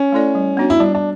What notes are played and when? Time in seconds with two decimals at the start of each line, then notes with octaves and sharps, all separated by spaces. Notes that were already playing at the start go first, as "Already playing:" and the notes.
Already playing: C#4
0.12 A3 E4 A4 D5
0.35 G3
0.57 B3 D4 F#4 C#5
0.70 E4
0.80 G3 D4
0.95 D4